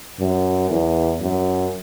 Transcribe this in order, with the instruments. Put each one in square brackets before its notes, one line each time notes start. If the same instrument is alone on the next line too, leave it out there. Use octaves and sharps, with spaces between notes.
[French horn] F#2
E2
F#2